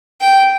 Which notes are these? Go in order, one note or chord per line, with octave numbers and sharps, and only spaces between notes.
G5